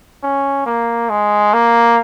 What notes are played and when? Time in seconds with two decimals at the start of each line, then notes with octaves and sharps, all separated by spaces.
0.23 C#4
0.66 A#3
1.09 G#3
1.53 A#3